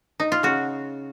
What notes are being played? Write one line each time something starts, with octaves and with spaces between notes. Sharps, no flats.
D#4
F4
C#3 F#4